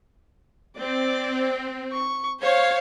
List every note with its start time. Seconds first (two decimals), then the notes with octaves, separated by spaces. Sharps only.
0.78 C4 D5
1.93 C#6
2.41 C5 C#5 F5